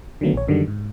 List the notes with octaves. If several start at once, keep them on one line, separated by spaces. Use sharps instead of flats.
D3 D#3 F#3 A3 B3
A#1 C#5
F#2 D3 D#3 F#3 G3
G#2